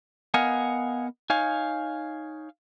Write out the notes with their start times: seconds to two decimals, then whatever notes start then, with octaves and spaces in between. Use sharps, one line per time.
0.34 B3 A#4 D#5 F5 F#5 G#5
1.30 D#4 C#5 F5 G#5